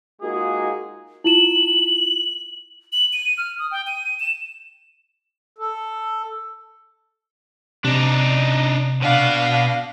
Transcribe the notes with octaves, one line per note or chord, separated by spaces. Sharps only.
G#3 A#3 D#4 F4 F#4 G#4
E4 F4 E7 F#7
F#7
D#7
F6
D#6
G5
D#7
E7
A4
C3 D4 D#4
B2 B3 D4 F5